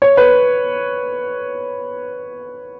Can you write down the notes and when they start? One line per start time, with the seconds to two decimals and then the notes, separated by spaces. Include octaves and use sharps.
0.02 C#5
0.17 B4